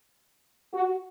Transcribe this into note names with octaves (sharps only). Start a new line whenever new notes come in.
F#4